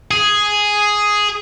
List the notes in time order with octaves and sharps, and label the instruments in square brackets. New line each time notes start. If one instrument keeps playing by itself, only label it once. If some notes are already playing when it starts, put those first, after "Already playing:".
[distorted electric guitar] G#4